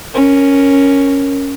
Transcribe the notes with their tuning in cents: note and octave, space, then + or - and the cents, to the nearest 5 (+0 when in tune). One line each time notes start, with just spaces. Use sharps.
C#4 +0 A#4 +0